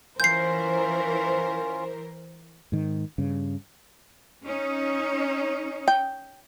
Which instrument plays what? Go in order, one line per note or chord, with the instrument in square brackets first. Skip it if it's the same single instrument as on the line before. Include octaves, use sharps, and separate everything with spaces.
[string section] E3 A#4 C5 [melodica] C#4 F4 [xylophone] G6 C7
[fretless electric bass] G#2 D#3
G2 C#3
[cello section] C#4 D#4
[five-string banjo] G5